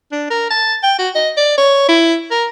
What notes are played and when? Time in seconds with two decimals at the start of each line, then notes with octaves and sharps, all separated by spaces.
0.12 D4
0.30 A#4
0.50 A5
0.83 G5
0.99 F#4
1.15 D#5
1.37 D5
1.57 C#5
1.88 E4
2.31 A#4